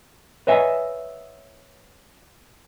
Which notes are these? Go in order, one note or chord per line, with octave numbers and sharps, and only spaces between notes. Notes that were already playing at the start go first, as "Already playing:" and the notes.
B4 C#5 D#5 E5 F#5 G#5